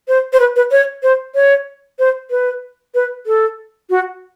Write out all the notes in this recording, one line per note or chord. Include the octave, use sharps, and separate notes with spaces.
C5
C5
B4
B4
C#5
C5
C#5
C5
B4
B4
A4
F#4